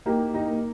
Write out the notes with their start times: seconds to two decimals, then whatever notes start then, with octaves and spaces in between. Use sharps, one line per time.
0.06 A#3 D#4 G4
0.34 D#4 G4
0.47 A#3